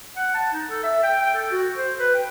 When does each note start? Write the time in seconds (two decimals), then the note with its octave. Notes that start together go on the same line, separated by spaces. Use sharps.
0.16 F#5
0.34 A5
0.53 D#4
0.68 A4
0.84 E5
1.03 G5
1.22 G5
1.35 A4
1.51 F#4
1.77 C5
1.99 B4
2.15 G5